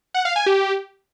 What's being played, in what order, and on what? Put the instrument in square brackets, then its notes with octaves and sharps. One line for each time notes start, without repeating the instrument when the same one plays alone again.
[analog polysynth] F#5
F5
G#5
G4